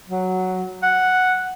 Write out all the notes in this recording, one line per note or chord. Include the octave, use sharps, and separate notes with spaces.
F#3
F#5